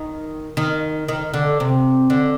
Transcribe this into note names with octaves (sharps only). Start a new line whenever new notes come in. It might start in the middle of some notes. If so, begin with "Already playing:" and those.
Already playing: D#3
D#3
D#3
D3
C3
D3